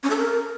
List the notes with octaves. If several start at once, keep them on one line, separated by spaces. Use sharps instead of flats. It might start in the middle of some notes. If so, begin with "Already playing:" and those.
C#4
A4
A#4